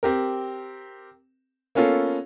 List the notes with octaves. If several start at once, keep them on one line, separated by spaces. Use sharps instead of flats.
C4 G4 A#4
A#3 B3 C#4 F4 A4